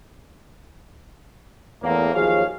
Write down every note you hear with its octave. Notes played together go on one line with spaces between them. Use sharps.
E2 A2 A#3
D#2 F3 F#3 G#4 C#5 F5